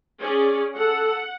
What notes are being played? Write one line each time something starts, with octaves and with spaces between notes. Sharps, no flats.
C#4 G#4 D5
A4 F#5